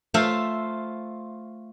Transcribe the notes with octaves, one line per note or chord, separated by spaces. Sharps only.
A3 F4 C5 E5